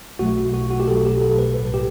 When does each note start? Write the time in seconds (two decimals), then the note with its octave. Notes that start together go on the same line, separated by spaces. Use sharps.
0.19 B1 B2 F#3 A3 F#4
0.54 F#4
0.70 F#4
0.80 G4
0.87 B1 B2 F#3 A3 A4
1.05 G4
1.21 A4
1.39 B4
1.56 B1 A2 G3 B4
1.74 G4